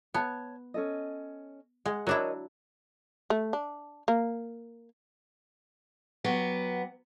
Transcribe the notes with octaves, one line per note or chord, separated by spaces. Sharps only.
B3 C#5 A5
C#4 A4 D#5
G#3 F#5
F#3 D4 E4 A#4 C#5 D#5
A3
D4
A#3
F#3 B3 G4